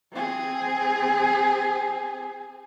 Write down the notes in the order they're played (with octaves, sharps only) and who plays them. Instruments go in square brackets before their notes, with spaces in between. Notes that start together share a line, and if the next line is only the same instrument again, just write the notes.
[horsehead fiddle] C4 G#4